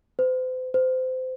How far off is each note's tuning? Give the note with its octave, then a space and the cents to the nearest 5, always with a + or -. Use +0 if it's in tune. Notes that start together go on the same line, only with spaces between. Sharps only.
C5 -40
C5 -25